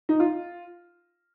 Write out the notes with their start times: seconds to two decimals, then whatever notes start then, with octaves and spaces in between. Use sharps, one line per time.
0.09 D#4
0.20 F4